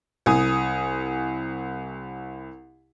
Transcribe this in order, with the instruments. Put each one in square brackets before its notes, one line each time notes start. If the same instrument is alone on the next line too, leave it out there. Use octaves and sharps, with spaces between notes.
[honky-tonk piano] C2 G#5 D#6